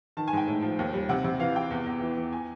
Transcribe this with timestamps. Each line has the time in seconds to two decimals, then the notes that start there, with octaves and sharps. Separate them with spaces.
0.17 D#3 A5
0.28 G#5
0.33 G#2 G5
0.48 A2
0.62 F3
0.79 D#2
0.94 G3
1.09 C3 F#5
1.24 C3
1.40 E3 F5
1.55 E3 G5
1.71 E2
1.86 E2
2.01 E3
2.16 E3
2.33 G#5